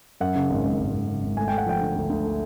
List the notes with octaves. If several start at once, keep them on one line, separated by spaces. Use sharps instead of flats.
F#2 F#5
C#3
G#1
G#1
G#1
G#1
C#3
G#1
A3 G#5
A3 G5
F#5
F3 G5
D3
D2
D2
A3